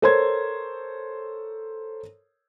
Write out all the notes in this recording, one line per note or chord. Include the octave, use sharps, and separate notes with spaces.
A4 A#4 C5 C#5 C6 G#6